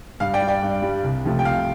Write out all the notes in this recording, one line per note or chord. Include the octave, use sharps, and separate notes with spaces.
G2 F5
D5 G5
G3
D5 G5
G2
G3
C2
C3 F3 A3
G5
C2 F5